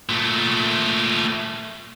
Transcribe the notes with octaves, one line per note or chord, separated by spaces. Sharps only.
A#2 A3